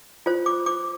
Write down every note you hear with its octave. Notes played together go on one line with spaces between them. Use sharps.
F4 C5
D6
D6